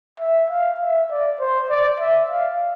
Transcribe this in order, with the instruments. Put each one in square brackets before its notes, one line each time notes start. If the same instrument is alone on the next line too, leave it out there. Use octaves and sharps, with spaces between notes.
[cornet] E5
F5
E5
D5
C5
D5
E5
F5